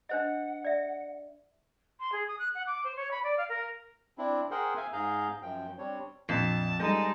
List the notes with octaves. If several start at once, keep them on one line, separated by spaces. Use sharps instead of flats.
D4 C5 D#5 F#5
D5 E5
C6
G#4
D#6
F#6
F#5
D6
C5
C#5
B5
D5
F5
A#4
C4 D4 E4
G#4 A#4 C5 F#5 G5
E5 F5 G#5
G#2 G#4 F5 A#5 G6
F#2 F3 G5
G3 C4 D4 C#5
A#1 F2 A5
G3 G#3 D#4 A4 G6 A#6